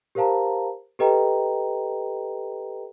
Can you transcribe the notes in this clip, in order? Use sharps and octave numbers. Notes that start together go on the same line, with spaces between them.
G4 A#4 C5 F5 A5 A#5
G4 A4 B4 D#5 G5 A#5